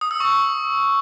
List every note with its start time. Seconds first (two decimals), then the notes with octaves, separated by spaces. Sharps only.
0.01 D#6
0.11 E6
0.20 C#6